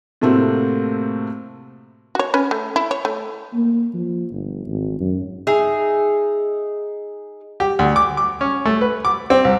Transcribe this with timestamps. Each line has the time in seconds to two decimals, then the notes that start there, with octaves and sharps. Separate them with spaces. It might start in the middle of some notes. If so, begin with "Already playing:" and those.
0.21 A2 C3 A3 A#3 C4 F#4
2.15 F#4 C#5
2.34 C#4 B4
2.51 A3
2.76 E4
2.91 C#5
3.05 A3
3.54 A#3
3.94 F3
4.32 G1
4.67 G#1
5.00 F#2
5.47 D#4 G#4 E5
7.60 G4
7.79 D2
7.96 D6
8.17 D6
8.41 C#4
8.65 A3
8.81 B4
9.05 D6
9.30 C4
9.45 C2